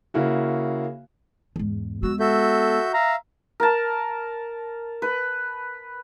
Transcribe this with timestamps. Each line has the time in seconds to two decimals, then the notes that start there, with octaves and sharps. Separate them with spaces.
0.14 C#3 A#3 E4 F#4
1.56 E2 G#2
2.03 G#3 B3 F#4 E6
2.20 F#4 A4 E5 G6
2.94 E5 F5 A#5
3.60 A#4 A5
5.02 B4